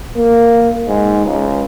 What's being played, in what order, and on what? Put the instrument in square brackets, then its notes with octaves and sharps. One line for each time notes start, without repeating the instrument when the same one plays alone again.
[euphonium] A#3
G#2
C#2